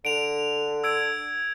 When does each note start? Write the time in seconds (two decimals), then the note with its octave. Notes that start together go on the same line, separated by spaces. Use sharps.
0.05 D3 D7 F7
0.84 E6 G#6 D7